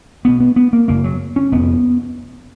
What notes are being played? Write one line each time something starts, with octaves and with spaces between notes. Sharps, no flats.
B1 B2 B3
B3
B3
A#3
F#1 F#2 C#3 A#3
F#3
C#4
F1 F2 C#3 B3